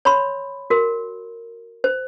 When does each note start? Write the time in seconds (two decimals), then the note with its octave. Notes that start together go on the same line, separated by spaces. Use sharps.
0.05 C#5 B5 C6
0.70 F#4 A#4
1.84 C5